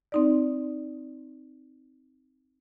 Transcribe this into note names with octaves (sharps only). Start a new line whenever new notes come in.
C4 D#4 D5